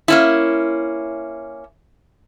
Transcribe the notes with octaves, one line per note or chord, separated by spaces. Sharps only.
A#3 C#4 E4